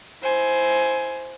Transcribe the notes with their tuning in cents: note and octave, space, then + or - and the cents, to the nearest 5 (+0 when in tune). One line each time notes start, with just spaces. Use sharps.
E4 +0 C5 +0 G#5 +15